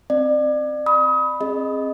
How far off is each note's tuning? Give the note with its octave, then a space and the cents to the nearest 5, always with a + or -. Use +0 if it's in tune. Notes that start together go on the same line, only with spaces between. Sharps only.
C4 +0 D5 +30
B5 +0 D#6 +30
C4 +30 G#4 +0 D#5 +0